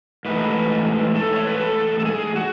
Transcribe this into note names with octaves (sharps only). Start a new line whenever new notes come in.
G#2 E3 A3 D#4 B4
A4
C#5
B4
A4
A4
G#4
F#4